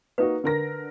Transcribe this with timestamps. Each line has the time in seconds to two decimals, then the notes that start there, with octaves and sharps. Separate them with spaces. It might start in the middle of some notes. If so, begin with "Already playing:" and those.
0.18 A#3 D#4 F#4 B4
0.44 D3 A#4 A#6